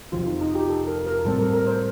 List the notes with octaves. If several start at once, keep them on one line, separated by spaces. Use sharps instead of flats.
F2 C3 F3 F4
D#4
D#4
G4
A4
A#4
A#4
A2 G3 C4 A4
A#4
A#4
C5